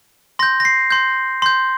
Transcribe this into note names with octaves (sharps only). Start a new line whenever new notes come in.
C6 G6 A#6
A#6
C7
C6 G6
C6 G6